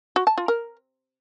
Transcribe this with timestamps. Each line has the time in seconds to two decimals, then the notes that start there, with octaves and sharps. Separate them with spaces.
0.16 F#4
0.27 A5
0.38 F4
0.48 A#4